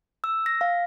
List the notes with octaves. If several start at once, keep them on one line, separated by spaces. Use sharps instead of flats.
E6
A#6
F5